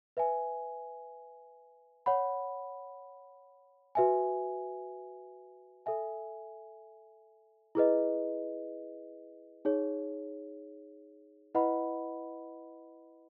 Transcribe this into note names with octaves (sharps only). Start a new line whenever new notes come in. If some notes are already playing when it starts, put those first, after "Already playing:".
B4 E5 G#5
C#5 F#5 B5
F#4 B4 E5 G#5
A4 E5 G#5
E4 G#4 B4 D#5
D#4 G#4 C#5
E4 B4 D#5 F#5 B5